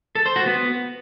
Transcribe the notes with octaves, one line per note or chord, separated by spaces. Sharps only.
A4
C5
F#4
B3